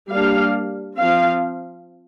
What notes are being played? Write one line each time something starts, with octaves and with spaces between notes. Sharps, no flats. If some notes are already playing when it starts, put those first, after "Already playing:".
G3 A#3 D4 F5
F3 C4 F5